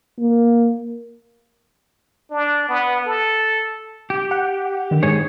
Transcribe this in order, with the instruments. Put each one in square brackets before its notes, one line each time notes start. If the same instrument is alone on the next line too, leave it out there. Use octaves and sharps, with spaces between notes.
[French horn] A#3
[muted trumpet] D4
B3
A4
[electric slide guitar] G4
[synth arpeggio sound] F#5
D3 D#3
[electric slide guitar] G#2 G#4 C#5